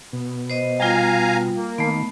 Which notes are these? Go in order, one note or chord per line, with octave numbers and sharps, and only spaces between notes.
B2
C5 D#5
G3 F4 F5 G#5 A#5
A#3
D#3 A3 B3